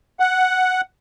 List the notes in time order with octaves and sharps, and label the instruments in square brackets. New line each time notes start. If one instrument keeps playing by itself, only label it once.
[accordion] F#5